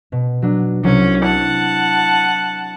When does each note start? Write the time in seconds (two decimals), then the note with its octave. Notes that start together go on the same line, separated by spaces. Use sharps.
0.12 B2
0.42 F#3 D4
0.84 C2 F#3 C#4
1.24 E4 F#5 A5 C#7
2.15 D#7